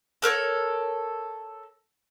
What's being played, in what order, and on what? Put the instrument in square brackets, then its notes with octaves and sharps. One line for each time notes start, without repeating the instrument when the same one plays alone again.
[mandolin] A4 A#4 C5 C#5